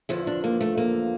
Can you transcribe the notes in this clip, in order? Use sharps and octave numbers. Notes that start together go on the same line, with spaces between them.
E2 D3 F3 E4
D4
A#3
A3
A#3